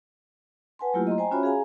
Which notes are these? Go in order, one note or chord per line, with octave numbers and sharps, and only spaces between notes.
B4 F#5 G#5 A5 C6
F#3 A3 A#3 E4 F4 G4
D#5 A#5 C6
C5 G5 G#5 A#5
C#4 F4 F#4 C#5 E5 B5
G#4 F5 G#5 A#5